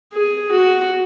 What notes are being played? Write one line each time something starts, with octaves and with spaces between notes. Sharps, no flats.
G#4
F#4